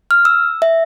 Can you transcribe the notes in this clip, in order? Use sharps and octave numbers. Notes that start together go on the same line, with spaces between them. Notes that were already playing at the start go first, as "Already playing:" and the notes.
F6
E6
E5